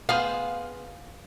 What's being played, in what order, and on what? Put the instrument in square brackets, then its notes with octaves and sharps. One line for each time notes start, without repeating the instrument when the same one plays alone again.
[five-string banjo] B3 G#4 C5 [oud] F5